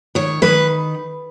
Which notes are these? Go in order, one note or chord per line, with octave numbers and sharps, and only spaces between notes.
D#3 C#5
D#3 B4